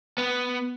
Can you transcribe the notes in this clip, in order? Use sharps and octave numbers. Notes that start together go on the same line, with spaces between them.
B3